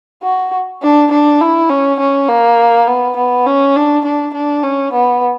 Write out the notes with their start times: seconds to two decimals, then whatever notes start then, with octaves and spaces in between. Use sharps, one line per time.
0.23 F#4
0.82 D4
1.11 D4
1.41 E4
1.70 C#4
2.00 C#4
2.29 A#3
2.87 B3
3.17 B3
3.46 C#4
3.76 D4
4.05 D4
4.34 D4
4.63 C#4
4.93 B3